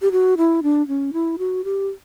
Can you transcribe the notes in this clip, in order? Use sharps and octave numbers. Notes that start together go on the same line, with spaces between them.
G4
F#4
E4
D4
C#4
E4
F#4
G4